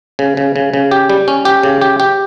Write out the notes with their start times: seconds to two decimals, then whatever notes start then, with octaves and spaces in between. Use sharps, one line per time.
0.19 C#3
0.37 C#3
0.56 C#3
0.74 C#3
0.91 G4
1.10 G3
1.28 C#4
1.45 G4
1.63 C#3
1.81 G4
2.00 G4